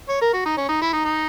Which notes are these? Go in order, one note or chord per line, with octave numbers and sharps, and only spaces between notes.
C#5
A#4
F#4
D#4
C#4
D#4
E4
D#4
D#4